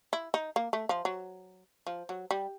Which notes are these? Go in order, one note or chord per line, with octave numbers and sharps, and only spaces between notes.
E4
D#4
A#3
A3
F3
F#3
F3
F#3
G3